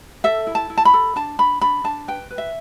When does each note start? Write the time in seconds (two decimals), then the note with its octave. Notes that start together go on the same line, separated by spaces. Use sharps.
0.24 A4 E5
0.47 E4
0.55 A5
0.70 E4
0.78 A5
0.85 B5
0.94 A4
1.16 D4 A5
1.39 D4 B5
1.61 D4 B5
1.84 D4 A5
2.08 B4 G5
2.30 B4
2.38 E5